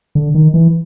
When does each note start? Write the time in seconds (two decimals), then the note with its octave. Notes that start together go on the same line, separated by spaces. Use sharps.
0.15 D3
0.34 D#3
0.54 E3